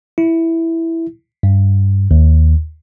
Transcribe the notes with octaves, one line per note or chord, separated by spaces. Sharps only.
E4
G2
D#2